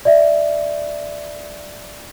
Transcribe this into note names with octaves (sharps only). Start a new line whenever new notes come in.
D5 E5